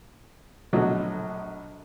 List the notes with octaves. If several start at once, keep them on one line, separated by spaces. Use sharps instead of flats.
A#1 B2 F#3 A3